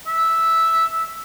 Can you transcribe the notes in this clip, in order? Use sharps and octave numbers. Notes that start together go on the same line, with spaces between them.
E5